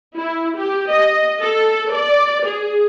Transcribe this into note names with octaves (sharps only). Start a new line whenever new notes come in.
E4
G4
D#5
A4
D5
G#4